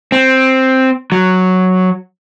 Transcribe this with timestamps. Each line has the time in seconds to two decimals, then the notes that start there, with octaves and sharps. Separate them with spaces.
0.12 C4
1.12 F#3